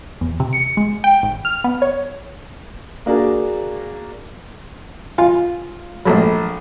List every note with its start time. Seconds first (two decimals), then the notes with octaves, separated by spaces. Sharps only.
0.21 E2
0.40 C3
0.53 C#7
0.77 G#3
1.04 G5
1.23 G#1
1.45 F6
1.64 B3
1.82 C#5
3.06 A#3 D4 F#4 G#4 A#4
5.18 F4 F5 G#5 C6
6.06 A#1 G#2 F#3 A3 B5